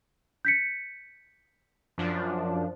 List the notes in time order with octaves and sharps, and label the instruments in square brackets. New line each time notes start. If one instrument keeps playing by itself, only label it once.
[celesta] G6 B6 C#7
[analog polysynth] F#2 F3 D4